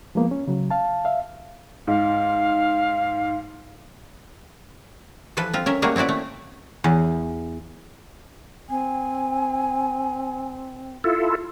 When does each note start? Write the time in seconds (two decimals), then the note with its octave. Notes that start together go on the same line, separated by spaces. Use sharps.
0.15 F3 G#3 A#3 B3
0.31 C#4
0.48 C#3 F#3
0.71 F5 A5
1.05 E5 F5
1.87 G#2 F5
5.37 E3 F3 A4 B4
5.53 C4 F4
5.66 C#4 A#4 E5
5.82 G3 A3 A#3 F#4 G#4
5.96 C4 C#4 E4 F#4 D5
6.09 A3
6.84 E2
8.70 C4 G#5
11.04 E4 F4 A4